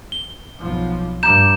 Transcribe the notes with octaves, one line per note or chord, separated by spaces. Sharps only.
G7
B1 F3
G2 A#5 G6 E7